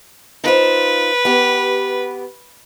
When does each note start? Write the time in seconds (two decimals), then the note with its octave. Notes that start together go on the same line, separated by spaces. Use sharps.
0.44 D#4 F4 B4 C5
1.25 B3 G4